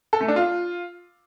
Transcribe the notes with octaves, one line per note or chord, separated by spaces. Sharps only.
A4
A3
D4
F4